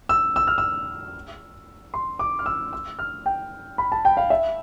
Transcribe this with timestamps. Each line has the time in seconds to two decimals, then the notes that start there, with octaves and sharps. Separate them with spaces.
0.09 E6
0.36 E6
0.47 F6
0.58 E6
1.94 C6
2.19 D6
2.39 F6
2.46 E6
2.73 E6
2.99 F6
3.26 G5
3.78 B5
3.92 A5
4.05 G5
4.17 F5
4.30 E5